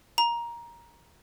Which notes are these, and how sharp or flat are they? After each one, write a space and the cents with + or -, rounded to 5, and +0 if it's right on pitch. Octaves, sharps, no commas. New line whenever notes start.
A#5 +15